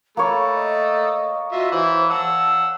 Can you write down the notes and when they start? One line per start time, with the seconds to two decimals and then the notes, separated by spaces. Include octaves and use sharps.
0.17 A3 A#3 C#5 B5
0.55 D#5
1.52 F4 F#4 D#5 E5
1.72 E3 E4 C5
2.10 F#5 A5 E6